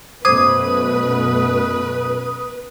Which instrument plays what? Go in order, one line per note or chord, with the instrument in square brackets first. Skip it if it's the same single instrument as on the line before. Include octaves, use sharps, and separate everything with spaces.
[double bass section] F#2 B2 A3 [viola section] B4 [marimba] C5 D6 G#6 [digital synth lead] D#6